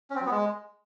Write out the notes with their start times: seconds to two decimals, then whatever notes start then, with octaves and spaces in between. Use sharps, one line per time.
0.10 C#4
0.15 C4
0.21 F#3
0.26 B3
0.31 G#3